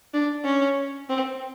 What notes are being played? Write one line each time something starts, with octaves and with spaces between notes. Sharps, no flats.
D4
C#4
C4